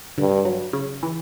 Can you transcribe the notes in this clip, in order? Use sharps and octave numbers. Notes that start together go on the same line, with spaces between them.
G2 D3
F#3
C#3
E3